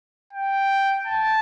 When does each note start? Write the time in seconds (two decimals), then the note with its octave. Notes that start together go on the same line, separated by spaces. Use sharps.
0.33 G5
1.07 A5